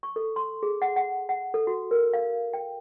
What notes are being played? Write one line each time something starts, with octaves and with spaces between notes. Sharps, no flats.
C#6
A4
C6
G#4
F#5
F#5
F#5
A4
F#4
A#4
F5
G5